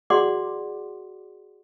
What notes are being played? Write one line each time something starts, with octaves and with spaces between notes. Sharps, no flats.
F#4 G#4 D5 F#5 C6 D6